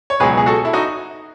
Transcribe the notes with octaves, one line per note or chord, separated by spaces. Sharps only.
C#5
C#2 B2 F#3 G#4 B4
G#4
F#4 A4
E4
D#4 F#4